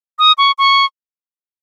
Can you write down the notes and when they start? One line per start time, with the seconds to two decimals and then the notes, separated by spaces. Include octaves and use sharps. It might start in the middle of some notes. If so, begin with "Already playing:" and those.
0.19 D#6
0.38 C#6
0.58 C#6